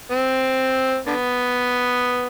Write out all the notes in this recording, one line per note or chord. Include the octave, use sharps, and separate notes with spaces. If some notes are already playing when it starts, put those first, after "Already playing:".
C4
D3 B3